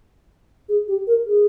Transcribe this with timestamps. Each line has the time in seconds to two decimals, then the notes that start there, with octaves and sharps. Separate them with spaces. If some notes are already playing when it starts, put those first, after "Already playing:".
0.69 G#4
0.88 G4
1.07 A#4
1.26 G#4